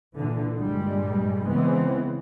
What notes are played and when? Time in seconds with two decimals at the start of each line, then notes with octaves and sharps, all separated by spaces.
0.17 A#2 D3 E3
0.57 G2 A#2 G3 G#3
1.46 C#3 E3 G#3 B3 C4